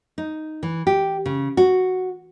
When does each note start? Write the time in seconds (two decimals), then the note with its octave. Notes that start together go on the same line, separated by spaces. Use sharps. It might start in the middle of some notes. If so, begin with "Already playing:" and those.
0.18 D#4
0.63 E3
0.87 G4
1.26 C#3
1.57 F#4